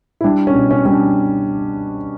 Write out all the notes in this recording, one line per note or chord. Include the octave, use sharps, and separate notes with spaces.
E4
G3 D4
C#4
B2
C#4
G3 C#4
D4